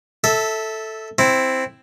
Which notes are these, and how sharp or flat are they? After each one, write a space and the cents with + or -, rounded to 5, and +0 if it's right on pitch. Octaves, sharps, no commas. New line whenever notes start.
A4 +0 E5 -15
C4 +0 E4 +0